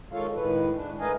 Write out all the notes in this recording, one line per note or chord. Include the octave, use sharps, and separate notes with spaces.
D#3 G#3 F4 A4 C#5 F5
A2 D#3 G#3 B4
D4
A3 A#4 B4 D#5 F5 G#5